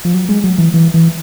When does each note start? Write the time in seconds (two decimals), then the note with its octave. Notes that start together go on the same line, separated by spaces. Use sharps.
0.05 F3
0.14 F#3
0.29 G#3
0.44 F#3
0.58 E3
0.74 E3
0.94 E3